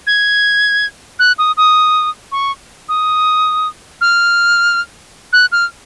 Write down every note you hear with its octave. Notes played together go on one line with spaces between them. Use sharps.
G#6
F#6
D#6
D#6
C#6
D#6
F6
F#6
F6